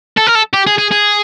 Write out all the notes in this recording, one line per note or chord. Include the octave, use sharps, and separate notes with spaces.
A4
A#4
A4
G4
G#4
G#4
G#4